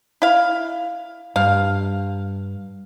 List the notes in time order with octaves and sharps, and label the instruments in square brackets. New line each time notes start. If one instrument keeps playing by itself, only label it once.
[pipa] E4 F5
[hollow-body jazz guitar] G2 [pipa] F5